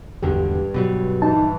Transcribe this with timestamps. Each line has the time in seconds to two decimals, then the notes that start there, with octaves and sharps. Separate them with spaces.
0.23 G#1 E2 G2 D3 G4
0.74 B2 F#3 G3
1.22 A#1 G2 E3 D#4 A5